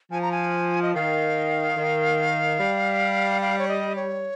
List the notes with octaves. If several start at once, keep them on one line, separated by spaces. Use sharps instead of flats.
F3 G#5
A#5
G#5
D#5
D#3 F5
D#3
G3
F5
C#5
D#5
C#5